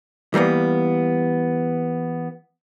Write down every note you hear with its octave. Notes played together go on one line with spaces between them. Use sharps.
E3 G3 A#3 B3